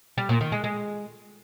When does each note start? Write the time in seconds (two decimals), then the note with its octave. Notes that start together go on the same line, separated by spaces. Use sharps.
0.18 G3
0.29 A#2
0.41 D#3
0.52 G#3
0.64 G#3